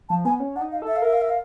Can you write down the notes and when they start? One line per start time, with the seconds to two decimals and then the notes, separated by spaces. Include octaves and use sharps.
0.09 F3 A5
0.25 B3 G#5
0.40 C#4
0.56 D4 F#5
0.61 D#4
0.72 F5
0.82 A4
0.87 E5
0.96 F5
1.02 A#4 E5
1.13 F5
1.21 E5
1.29 F5